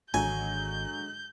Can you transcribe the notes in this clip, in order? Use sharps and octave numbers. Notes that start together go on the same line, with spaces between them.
G#1 D3 F#3 G#3 G#5 G6